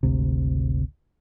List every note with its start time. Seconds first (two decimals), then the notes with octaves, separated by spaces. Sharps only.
0.03 G#1 D2 C3